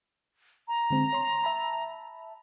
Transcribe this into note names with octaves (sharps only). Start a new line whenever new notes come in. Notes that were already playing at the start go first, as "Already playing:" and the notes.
A#5
D3 G#3 C4
C#5 C6
E5 A5 B5